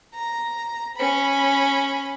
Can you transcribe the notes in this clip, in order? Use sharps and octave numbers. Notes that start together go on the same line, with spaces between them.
A#5
C#4 B5